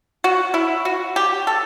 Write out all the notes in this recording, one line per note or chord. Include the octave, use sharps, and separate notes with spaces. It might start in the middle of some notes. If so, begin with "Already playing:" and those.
F#4
E4
F#4
G4
A4